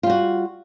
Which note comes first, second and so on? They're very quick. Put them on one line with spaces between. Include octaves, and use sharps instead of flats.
F4 G3 F#4